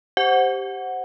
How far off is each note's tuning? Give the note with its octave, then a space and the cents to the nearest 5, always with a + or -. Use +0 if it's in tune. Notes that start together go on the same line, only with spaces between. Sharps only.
G4 +0 C5 +0 F#5 -5